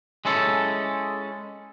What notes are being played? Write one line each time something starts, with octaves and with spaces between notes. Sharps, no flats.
G#3 C#4 E4 A4